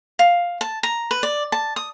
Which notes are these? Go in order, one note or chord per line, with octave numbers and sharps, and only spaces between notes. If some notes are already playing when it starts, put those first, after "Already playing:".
F5
A5
A#5
B4
D5
A5
D#6